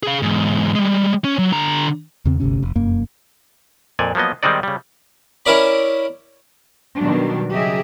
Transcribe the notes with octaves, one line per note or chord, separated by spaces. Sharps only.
G#4 F5
E2 G#2
G3 G#3
C#4
F#3
D3 A#5
E2 C#3 C4
G1 D2 C3 C#4
F1
F1 F#2 A#3
F2 A#2 D5 G#5
F3 F#3 A#3 B3 D#5
D#3 G3 G#3 C4 D#4 D5
C#3 G3
C#4 E4 A#4 D5 B5
B2 D#3 F#3 G3 D4
C#3 F#3 G4 G#4 D#5 E5